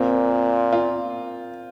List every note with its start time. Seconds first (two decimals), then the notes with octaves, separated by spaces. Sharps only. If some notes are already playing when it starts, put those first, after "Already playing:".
Already playing: A#2 C4
0.73 F4